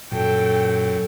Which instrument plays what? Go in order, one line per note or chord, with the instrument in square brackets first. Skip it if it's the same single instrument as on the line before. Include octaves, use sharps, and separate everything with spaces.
[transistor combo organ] F#2 [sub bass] A#2 [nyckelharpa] A4 [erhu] G5